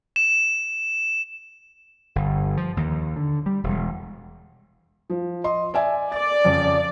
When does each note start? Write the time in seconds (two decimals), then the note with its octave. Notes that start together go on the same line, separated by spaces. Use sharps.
0.16 E7
2.16 G1
2.57 F3
2.77 D#2
3.16 D3
3.46 G3
3.64 E1
5.10 F3
5.44 D#5 C6
5.74 D5 E5 G#5
6.12 D5 A6
6.45 F2 C#3